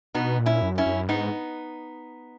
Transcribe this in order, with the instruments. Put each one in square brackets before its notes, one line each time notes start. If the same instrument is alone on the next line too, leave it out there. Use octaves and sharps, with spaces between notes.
[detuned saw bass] B2 [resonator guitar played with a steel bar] B3 D#4
[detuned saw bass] A#2
[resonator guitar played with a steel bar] C#4 E4
[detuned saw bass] F#2
[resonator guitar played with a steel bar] C#4 E4
[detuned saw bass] F#2
[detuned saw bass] G#2 [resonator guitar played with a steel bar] B3 D#4